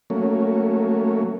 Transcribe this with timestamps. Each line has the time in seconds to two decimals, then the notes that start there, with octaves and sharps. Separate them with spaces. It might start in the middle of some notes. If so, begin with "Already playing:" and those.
0.10 F#3 A3 A#3 C#4